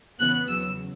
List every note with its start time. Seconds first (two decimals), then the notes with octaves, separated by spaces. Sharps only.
0.19 E2 C#3 E3 B3 F#6
0.48 E2 C#3 F#3 E6